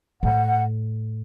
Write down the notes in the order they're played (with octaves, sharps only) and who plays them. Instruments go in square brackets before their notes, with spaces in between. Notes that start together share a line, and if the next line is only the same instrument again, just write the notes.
[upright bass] A2 [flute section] F#5